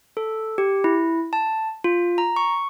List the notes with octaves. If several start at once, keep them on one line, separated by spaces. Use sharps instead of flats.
A4
G4
E4
A5
F4
A#5
C#6